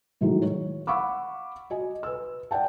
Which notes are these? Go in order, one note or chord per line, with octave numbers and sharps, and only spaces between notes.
A2 D#3 E3 F#3 G#3
C#5
F5 F#5 B5 C#6 D6 E6
F#4 D#5 G#5
B4 E6
D5 F#5 G5 A5